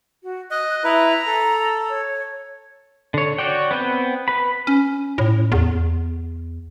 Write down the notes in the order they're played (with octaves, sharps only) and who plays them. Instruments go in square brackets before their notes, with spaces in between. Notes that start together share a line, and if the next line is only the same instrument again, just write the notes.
[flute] F#4
[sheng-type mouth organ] D#5 [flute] F#6
[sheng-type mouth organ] E4 B4 [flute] A#5
[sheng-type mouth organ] A4
[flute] C#5
[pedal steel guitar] D3 C#5
F#4 C#5 D5 G5
B3 C4 B4 G5
B4 B5
[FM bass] C#4
A2
E2